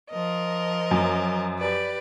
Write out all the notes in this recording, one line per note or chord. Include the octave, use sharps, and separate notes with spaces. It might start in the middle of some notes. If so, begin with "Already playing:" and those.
F3 A#4 D#5
F#2
G4 B4 D5